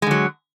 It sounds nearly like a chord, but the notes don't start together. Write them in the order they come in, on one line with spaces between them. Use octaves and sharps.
G#3 D3 F#3